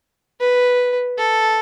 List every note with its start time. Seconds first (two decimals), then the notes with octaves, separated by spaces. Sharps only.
0.40 B4
1.18 A4